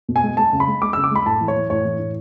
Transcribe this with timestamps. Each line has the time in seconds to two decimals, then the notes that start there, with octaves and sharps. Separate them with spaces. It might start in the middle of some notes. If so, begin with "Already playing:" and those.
0.09 B2
0.16 G#5
0.23 G#3
0.37 G#3 A5
0.53 C#3
0.60 B5
0.67 G#3
0.82 G#3 D6
0.93 C#3 E6
1.04 D6
1.11 G#3 B5
1.26 A2 A5
1.41 E3
1.48 C#5
1.56 E3
1.70 A2 C#5
1.85 E3
2.00 A2